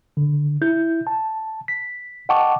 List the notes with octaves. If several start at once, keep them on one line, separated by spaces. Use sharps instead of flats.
D3
E4 G6
A5
B6
D#5 F#5 G5 A5 C#6 D6